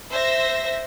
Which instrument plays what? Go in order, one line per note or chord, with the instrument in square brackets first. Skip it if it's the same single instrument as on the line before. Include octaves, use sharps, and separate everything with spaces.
[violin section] C5 E5 A#6